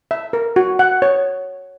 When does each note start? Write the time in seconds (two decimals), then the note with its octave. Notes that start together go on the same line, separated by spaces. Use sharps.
0.11 E5
0.33 A#4
0.56 F#4
0.79 F#5
1.02 C#5